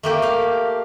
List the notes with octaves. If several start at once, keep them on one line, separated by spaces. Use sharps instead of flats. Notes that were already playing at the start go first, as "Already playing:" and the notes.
A3 A#3 G4
G4 F5